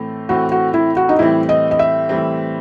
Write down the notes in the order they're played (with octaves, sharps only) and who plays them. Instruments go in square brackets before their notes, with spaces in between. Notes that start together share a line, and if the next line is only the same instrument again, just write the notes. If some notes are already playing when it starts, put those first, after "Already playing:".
Already playing: [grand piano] A2 E3 A3 C4
[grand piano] A2 E3 A3 C4 [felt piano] F#4
[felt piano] F#4
E4
F#4
D#4
[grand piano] A2 E3 G3 C4 [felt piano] E4
[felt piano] D#5
D#5
E5
[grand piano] A2 E3 G3 C4